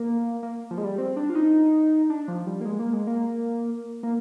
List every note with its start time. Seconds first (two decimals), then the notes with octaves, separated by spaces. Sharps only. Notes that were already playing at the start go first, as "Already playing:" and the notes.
Already playing: A#3
0.43 A#3
0.71 F3
0.78 G#3
0.84 G3
0.98 C4
1.17 D4
1.30 F4
1.35 D#4
2.10 D4
2.28 F3
2.47 G3
2.61 A#3
2.65 G#3
2.79 A#3
2.93 G#3
3.07 A#3
4.03 A#3